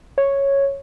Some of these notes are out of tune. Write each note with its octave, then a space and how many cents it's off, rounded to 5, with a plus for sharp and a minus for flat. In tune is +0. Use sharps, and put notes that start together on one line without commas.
C#5 -5